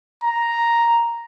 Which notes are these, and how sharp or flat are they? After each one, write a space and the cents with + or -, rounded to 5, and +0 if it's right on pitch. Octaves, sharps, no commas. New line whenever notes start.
A#5 +0